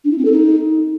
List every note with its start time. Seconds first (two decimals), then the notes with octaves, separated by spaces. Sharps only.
0.04 D4
0.11 E4
0.18 C4
0.25 A4
0.32 D#4